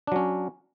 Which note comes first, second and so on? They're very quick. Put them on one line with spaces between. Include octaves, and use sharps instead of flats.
D4 F#3 C#4